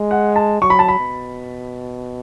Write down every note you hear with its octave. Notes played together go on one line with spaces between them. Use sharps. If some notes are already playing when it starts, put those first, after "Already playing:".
Already playing: G#3
F#5
A5
F#3 C#6
B5
A5
B5
B2